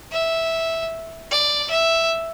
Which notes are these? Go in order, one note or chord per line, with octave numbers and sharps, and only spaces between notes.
E5
D5
E5